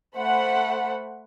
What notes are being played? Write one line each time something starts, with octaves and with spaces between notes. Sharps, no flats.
A3 C5 F#5 B5